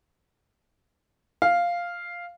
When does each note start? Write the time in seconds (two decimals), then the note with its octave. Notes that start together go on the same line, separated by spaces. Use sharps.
1.42 F5